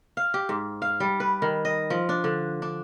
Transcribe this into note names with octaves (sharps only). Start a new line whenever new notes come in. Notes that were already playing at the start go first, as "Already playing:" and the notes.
F5
G4
G#2
F5
G3
B4
D#3
D#5
F3
D4
D3
D4